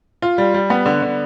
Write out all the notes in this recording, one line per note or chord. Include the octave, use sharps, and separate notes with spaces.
F4
G3
G3
B3
D3
D3